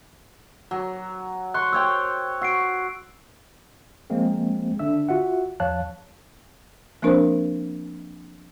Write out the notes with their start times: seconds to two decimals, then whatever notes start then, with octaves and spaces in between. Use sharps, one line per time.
0.71 F#3
1.54 C6 C#6 F#6
1.73 C5 C#5 G5 E6
2.42 F#4 E6 C7 D7
4.10 F3 G#3 A#3 C4
4.79 D3 D4 E5 E6
5.09 F4 F#4 E5 F#5
5.60 E2 F3 C#5 F5 A5 F#6
7.02 F3 A#3 C4 D4 A#4 C5